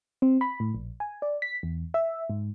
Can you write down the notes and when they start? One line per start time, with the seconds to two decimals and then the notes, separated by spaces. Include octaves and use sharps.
0.22 C4
0.41 B5
0.60 A2
0.75 A#1
1.00 G#5
1.22 D5
1.42 B6
1.63 E2
1.94 E5
2.30 G#2